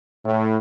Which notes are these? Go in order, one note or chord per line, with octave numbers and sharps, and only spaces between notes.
A2